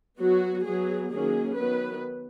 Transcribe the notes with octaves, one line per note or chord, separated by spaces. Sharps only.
F#3 B3 F#4
F#3 B3 G#4
D#3 F#3 A#3 C#4 G#4
D#3 F#3 B3 B4